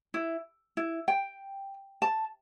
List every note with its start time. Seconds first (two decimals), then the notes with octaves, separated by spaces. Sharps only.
0.14 E4
0.77 E4
1.08 G5
2.02 A5